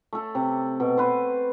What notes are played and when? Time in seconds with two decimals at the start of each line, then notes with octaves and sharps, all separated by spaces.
0.13 A3 A4
0.35 C3
0.80 B2
0.97 B4 C5